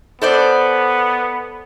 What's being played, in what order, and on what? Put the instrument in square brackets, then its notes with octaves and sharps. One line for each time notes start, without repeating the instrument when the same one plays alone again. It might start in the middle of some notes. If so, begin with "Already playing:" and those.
[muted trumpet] B3 [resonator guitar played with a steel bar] A4 C5 D5